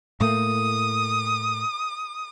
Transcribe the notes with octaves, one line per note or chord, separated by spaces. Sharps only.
A2 A3 A#3 D#6